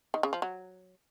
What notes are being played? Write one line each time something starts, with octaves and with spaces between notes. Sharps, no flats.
D#3
C#3
F3
F#3